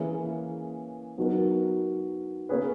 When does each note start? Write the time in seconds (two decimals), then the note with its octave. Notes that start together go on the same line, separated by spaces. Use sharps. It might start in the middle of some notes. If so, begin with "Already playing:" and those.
Already playing: E3 A#3 C#4 G#4 B4
1.18 F#3 B3 D#4 F#4 A#4
2.49 A#3 C#4 G#4 B4